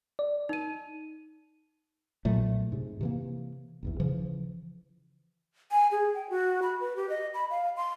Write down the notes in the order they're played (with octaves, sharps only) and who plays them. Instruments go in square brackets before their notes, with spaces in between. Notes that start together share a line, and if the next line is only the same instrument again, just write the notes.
[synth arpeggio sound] D5
[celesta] D#4 D#7
[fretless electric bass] B1 A#2 F#3 A3
G#2 C3
C3 E3 A#3
F#1 B1 E2
C#3 E3 F3
[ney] G#5
G#4
G5
F#4
B5
B4
G4
D#5
B5
F5
C6